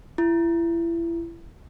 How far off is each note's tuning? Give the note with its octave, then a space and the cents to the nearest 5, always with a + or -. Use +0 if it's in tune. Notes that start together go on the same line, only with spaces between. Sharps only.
E4 +30